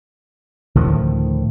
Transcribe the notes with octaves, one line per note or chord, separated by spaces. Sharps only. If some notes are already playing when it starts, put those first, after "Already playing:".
D2 A2 D#3 F3